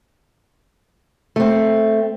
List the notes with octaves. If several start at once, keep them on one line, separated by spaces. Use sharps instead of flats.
A3 C4